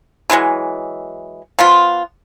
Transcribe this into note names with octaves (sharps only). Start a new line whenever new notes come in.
D3 E3 F#3 G#3
F3 B3 F4